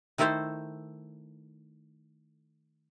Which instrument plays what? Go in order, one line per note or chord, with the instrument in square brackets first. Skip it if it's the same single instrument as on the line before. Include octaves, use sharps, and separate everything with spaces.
[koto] D#3 A3 E4 A4 C5